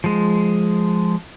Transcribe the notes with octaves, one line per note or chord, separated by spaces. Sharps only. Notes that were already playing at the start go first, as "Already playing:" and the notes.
F3 G#3